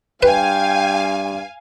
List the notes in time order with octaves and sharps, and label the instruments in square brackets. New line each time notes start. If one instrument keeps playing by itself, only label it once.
[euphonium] G2 [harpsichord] B4 [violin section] F5 G#5 [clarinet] G5